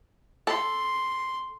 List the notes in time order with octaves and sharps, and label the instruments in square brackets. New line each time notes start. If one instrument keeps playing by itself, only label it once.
[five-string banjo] A4 [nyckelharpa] C6